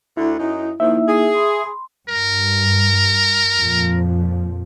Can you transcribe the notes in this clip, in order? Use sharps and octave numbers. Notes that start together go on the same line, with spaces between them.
D2 D3 E4
F#2 D#4
D#3 F3 A#3 D#4 E4 E5
G#4
B5 C6
G2 A#4
F2 A#2 F3